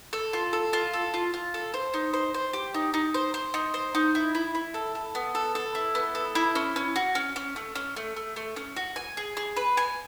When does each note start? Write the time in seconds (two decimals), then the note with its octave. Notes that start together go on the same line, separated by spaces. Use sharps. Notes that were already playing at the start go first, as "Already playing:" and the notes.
0.13 A4
0.33 F4
0.53 A4
0.73 F4
0.94 A4
1.14 F4
1.34 F4
1.54 A4
1.74 C5
1.94 D#4
2.14 C5
2.34 C5
2.53 G4
2.74 D#4
2.94 D#4
3.14 C5
3.34 C5
3.54 D#4
3.74 C5
3.95 D#4
4.15 E4
4.35 E4
4.55 E4
4.74 A4
4.95 A4
5.15 B3
5.35 A4
5.55 A4
5.75 E4
5.95 B3
6.15 A4
6.35 E4
6.55 C#4
6.76 C#4
6.96 F#4
7.15 C#4
7.36 C#4
7.56 A3
7.75 C#4
7.96 A3
8.16 A3
8.36 A3
8.56 C#4
8.76 F#4
8.96 G#5
9.17 G#4
9.37 G#4
9.56 B4
9.77 G#5